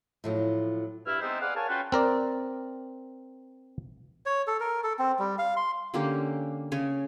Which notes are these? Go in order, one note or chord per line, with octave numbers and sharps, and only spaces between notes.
A2 F3 F#3
G2 E4 B4 E6 F6
G#3 B3 C4 D#4 C5 E5
G#4 B4 D5 F5 F#5
A#4 C#5 F5 G#5 A5
C#4 F4 F#4 B4 F#5 G5
C4 A#4 D5
C#5
A4
A#4
A4
C4
G3
F5
C6
D3 A#3 C#4 G4
C#3 C#5 G#5